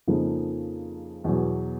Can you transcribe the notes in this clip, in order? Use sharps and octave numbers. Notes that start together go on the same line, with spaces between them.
F2 C#3 F3 A#3 D#4
E2 B2 F#3